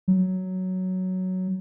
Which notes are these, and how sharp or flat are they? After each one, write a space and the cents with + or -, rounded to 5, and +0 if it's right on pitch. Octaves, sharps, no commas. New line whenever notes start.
F#3 +5